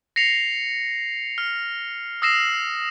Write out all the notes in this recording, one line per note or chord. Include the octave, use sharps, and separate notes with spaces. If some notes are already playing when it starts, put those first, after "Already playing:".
A#6 C7 C#7 F7
F6
D#6 E6 A#6 C7 E7